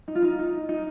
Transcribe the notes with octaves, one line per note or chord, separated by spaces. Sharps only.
D#4
F4
D#4
D#4
D#4